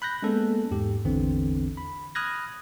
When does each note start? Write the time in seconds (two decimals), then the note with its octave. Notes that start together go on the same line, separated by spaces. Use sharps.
0.02 B5 F#6 G6 A#6
0.22 G#3 A#3 B3 C#4 A4
0.71 E2 G#2 G4
1.05 A1 E2 D3 E3 C4
1.77 B5
2.15 B5 D#6 F6 F#6 G#6 A#6